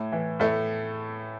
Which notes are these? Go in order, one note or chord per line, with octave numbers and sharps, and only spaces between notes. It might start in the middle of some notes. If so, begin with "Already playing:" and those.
Already playing: A2
E3
A2 A3